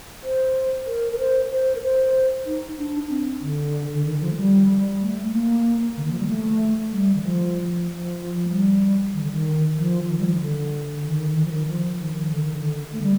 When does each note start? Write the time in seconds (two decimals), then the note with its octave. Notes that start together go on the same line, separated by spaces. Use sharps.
0.23 C5
0.87 A#4
1.13 A#4
1.19 C5
1.51 C5
1.75 A#4
1.82 C5
2.46 D#4
2.78 D4
3.10 C4
3.41 D3
3.94 D3
4.05 D#3
4.21 F3
4.33 A3
4.37 G3
5.00 A3
5.32 A#3
5.97 D3
6.05 D#3
6.12 F3
6.19 G3
6.28 A3
6.91 G3
7.15 D#3
7.23 F3
7.87 F3
8.45 A3
8.50 G3
9.14 D#3
9.23 D3
9.33 D#3
9.77 F3
10.09 D#3
10.19 G3
10.26 F3
10.33 D#3
10.41 D3
11.05 D#3
11.36 D#3
11.45 F3
11.52 D#3
11.68 F3
12.00 D#3
12.31 D3
12.45 D#3
12.58 D3
12.93 A3
13.02 G3